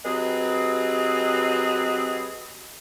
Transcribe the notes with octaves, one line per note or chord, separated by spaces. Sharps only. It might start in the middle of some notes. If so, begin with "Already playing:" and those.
F#3 C4 G4 G#4 B4 D#5